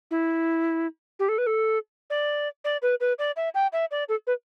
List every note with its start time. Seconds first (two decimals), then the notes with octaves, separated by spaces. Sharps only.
0.11 E4
1.19 G4
1.29 A4
1.38 B4
1.47 A4
2.10 D5
2.65 D5
2.82 B4
3.01 B4
3.19 D5
3.37 E5
3.55 G5
3.73 E5
3.91 D5
4.09 A4
4.27 B4